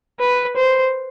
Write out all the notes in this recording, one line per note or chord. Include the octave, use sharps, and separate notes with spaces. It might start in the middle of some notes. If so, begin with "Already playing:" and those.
B4
C5